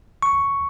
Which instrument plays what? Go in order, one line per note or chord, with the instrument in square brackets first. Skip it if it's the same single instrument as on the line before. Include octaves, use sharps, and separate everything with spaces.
[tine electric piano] C#6